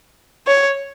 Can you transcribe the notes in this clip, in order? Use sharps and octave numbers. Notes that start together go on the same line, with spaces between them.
C#5